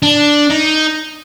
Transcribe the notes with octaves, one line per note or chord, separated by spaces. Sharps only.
D4
D#4